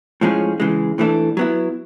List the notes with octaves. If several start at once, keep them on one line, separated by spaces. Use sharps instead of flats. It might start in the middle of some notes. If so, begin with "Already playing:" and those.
A2 F3 G#3 C#4
C#3 E3 G#3
A2 E3 A3 D4
F#3 B3 E4